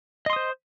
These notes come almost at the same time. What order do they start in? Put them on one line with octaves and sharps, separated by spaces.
D#5 C6 D#6 C5